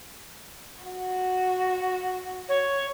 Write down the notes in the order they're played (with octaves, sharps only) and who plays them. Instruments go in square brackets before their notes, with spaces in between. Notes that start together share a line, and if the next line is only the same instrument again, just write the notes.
[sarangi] F#4
[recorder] C#5